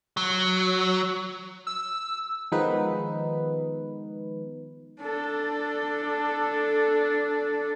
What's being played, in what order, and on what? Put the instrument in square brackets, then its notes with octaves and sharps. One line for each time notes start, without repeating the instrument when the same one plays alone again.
[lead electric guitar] F#3
[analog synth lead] E6
[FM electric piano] D#3 F3 G#3 B3 D#4 B4
[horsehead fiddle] D4 A4